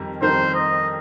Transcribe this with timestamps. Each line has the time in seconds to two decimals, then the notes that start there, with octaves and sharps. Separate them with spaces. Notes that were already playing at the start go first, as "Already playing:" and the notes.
Already playing: F2 D#3 G3 D#4 A#4
0.22 F2 D#3 G3 D#4 A#4 C5
0.55 D#5